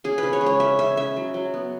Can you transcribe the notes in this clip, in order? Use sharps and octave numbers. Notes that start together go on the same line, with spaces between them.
C#3 G#4
C#3 B4
C#5
G#3
C#5
C#4 E5
C#3 E5
C#3 E5
F#3
F#3
B3